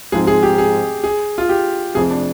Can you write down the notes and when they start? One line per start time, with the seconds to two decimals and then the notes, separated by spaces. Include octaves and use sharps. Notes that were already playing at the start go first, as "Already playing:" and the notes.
0.12 G#2 F3 G#3 C4 G#4
0.27 G#4
0.43 G4
0.58 G#4
1.04 G#4
1.38 F4
1.49 G4
1.95 F1 F2 C3 G#4
2.11 D4